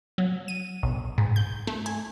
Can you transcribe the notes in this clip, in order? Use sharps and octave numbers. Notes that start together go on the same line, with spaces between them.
F#3
D#7
B1
G#2
G6
A3
G#5